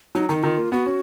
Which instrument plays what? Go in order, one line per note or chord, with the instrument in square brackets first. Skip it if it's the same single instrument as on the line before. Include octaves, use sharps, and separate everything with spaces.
[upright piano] F#3 [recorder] D#4
[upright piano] D#3 [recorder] D#4
[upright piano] D#3 [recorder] F4
[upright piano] A#3
[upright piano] B3 [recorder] F#4
[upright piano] C#4